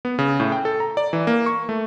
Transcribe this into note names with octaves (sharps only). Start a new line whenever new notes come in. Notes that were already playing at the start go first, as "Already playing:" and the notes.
B3
C#3
A2
G5
A4
A#5
D5
E3
A#3
C#6
A3